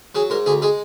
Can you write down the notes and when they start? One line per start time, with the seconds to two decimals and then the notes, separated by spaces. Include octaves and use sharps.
0.15 F#3 G#4
0.30 G#2 A#4
0.46 D2 G#4
0.62 G#3 G#4